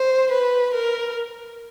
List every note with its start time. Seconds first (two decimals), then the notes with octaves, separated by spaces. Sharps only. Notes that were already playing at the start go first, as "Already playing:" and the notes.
Already playing: C5
0.32 B4
0.74 A#4